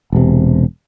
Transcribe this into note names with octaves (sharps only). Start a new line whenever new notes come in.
E1 C3